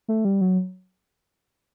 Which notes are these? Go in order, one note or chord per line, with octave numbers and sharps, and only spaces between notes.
A3
G3
F#3